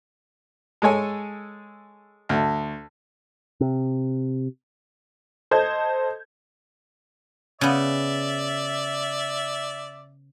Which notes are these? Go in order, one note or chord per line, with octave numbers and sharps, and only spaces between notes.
G#3 A4 C#5 G#5
D2
C3
A4 C5 D#5 G6 G#6
C#3 B3 D5 E5